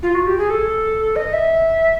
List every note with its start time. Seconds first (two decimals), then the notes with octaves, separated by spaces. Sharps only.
0.03 F4
0.15 F#4
0.27 G4
0.38 G#4
0.50 A4
1.16 D#5
1.33 E5